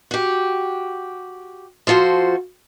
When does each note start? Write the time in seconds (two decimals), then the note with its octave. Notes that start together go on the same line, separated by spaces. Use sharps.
0.11 F#4 G4
1.87 F3 F4 F#4 A4 C5